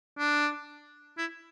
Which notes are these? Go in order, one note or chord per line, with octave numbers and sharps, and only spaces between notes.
D4
E4